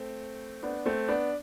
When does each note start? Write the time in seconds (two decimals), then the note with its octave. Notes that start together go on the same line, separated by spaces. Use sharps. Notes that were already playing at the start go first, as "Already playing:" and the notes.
Already playing: A3 C4
0.63 B3 D4
0.86 A3 C4
1.08 B3 D4